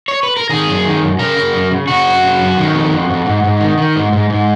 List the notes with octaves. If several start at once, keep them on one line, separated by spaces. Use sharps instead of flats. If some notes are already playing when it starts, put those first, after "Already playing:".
C#5
B4
A#4
D#3 G#4
F#2
D#3
F#2
C#3 A#4
C#3
F#2
C#3
C#3 F#4
F#2
C#3
F#2
D#3
F2
F2
F2
G#2
G#2
D#3
D#3
G#2
G#2
G#2